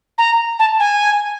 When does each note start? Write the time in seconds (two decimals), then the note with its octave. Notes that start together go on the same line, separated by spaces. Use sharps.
0.18 A#5
0.59 A5
0.80 G#5